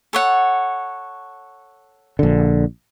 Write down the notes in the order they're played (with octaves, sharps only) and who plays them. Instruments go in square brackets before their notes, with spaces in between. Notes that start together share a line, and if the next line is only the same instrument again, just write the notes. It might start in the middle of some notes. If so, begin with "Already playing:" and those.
[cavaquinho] A4 C#5 F#5
[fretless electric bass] A#1 D3